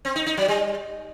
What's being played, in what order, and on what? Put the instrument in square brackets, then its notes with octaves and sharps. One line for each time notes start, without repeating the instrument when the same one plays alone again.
[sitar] C4
D#4
D#4
F#3
G3